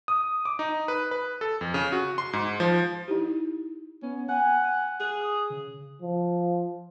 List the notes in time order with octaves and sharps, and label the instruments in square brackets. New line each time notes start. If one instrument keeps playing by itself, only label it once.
[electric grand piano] D#6
D6
D#4
B4
B4
A4
F2
C#3
F#4
C6
G#2
F3
[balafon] D#4 E4 G4
[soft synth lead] B3 [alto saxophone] C#4
[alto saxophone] F#5 [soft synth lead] G#5
[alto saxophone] G#4 [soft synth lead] F#6
[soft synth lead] D#6
C#3
[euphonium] F3